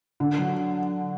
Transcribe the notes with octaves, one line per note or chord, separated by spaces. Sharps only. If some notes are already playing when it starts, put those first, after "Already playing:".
D3
F#3